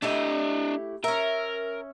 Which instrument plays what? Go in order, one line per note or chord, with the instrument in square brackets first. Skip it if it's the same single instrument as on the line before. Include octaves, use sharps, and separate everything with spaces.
[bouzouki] A3 E4 G4 [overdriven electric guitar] D4 D#5
[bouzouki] C#4 E5 [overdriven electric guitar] A#4